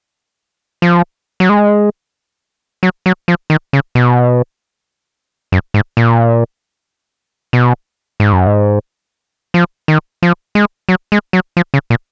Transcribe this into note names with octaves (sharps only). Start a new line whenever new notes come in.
F3
F#3
G#3
F#3
F#3
F3
D#3
C#3
B2
F#2
G#2
A#2
B2
G#2
F#2
G#2
F3
D#3
F3
G#3
F#3
G#3
F#3
F3
C#3
A#2